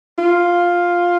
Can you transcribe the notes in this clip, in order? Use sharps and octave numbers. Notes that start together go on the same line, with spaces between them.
F4